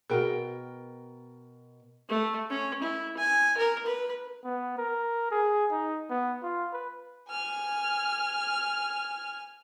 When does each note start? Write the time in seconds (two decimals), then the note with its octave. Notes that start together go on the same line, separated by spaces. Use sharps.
0.10 B2 F#4 G#4 A#4 G5
2.09 A3
2.50 C#4
2.82 E4
3.17 G#5
3.57 A#4
3.86 B4
4.44 B3
4.78 A#4
5.31 G#4
5.71 D#4
6.09 B3
6.43 F4
6.73 B4
7.29 G#5 F6